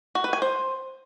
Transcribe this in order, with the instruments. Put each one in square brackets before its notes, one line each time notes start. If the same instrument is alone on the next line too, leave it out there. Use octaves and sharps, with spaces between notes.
[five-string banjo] F#4
B4
G#5
C5